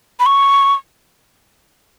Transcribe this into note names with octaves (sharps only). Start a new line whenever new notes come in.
B5
C#6